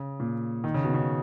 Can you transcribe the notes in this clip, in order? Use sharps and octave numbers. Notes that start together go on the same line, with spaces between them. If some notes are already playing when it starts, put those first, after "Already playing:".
Already playing: C#3
A#2
D#3
C#3
B2
C#3